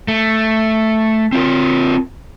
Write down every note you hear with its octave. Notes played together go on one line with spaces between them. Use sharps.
A3
C4 F4 A#4